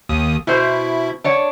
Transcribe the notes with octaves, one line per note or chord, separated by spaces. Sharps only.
D#2 D#6
B2 E4 C5
D4 C#5 F#5